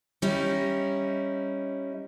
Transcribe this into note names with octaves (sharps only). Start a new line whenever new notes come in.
G3 C#4 D#4 E4